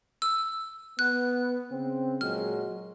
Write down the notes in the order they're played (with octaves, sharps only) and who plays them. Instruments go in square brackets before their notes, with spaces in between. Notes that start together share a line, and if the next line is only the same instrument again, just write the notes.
[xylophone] E6
[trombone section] B3 [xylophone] F#6
[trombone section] C#3 C4
[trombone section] A#2 F#3 G#3 [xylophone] F6